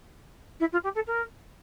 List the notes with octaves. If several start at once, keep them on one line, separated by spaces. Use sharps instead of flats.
E4
F4
G4
A4
A#4